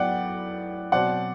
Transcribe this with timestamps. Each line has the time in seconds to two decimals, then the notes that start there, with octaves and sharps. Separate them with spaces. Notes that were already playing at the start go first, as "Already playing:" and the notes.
Already playing: A2 F#3 B3 D5 F#5 G5
0.92 B2 F#3 C4 D5 F#5